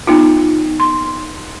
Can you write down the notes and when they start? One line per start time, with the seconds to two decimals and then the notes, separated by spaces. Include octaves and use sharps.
0.07 B3 D#4 F4
0.80 C6